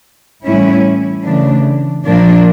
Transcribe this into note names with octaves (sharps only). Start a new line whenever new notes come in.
A2 E3 G3 C#4 E4
C#3 E3 A3 D4
A#2 F3 A#3 D4